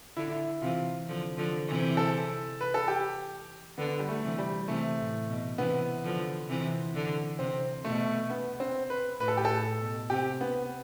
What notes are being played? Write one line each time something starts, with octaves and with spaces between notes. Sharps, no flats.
D3 E4
C3 E3 F4
D3 F3
D3 F3
C3 E3
A4
B4
A4
G4
D3 B3
G3
A3
C3 E3
G3
C3 E3 A3
A2
B2
C3 E3 B3
D3 F3
C3 E3
D3
C3 C4
B2 A3
B3
C4
B4
A2 B4
A4
G4
A2 A4
B2
C3 G4
B3